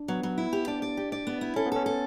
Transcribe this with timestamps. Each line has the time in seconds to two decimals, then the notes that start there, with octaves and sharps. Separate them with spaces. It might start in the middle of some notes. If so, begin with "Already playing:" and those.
Already playing: D4
0.08 F#3 B3
0.23 F#3
0.38 E4
0.53 G4
0.67 D4 D5
0.82 D5
0.97 G4
1.12 D5
1.27 B3
1.41 E4
1.56 C#4 A4
1.66 B3
1.72 C#4 A4
1.86 A4